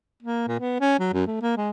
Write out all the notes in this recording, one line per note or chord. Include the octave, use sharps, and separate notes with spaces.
A#3
A#2
B3
C#4
F#3
F#2
A3
A#3
G#3